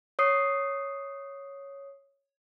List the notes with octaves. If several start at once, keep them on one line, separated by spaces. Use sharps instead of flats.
C#5 D#6 C7